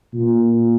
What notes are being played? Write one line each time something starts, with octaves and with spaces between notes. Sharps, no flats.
A#2